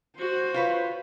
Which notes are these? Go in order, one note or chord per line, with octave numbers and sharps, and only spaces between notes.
F#4 C5
F4 B4 C#5